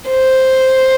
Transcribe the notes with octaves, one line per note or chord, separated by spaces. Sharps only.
C5